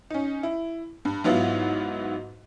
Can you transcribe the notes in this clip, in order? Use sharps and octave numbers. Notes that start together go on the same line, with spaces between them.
C#4 D#4
E4
G2
G#2 F#3 B3 E4 F4